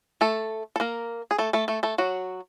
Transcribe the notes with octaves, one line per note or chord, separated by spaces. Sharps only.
A3 A4
A4
A#3 A#4
G#4
A3 A4
A3 A4
A3 A4
A3 A4
F#3 F#4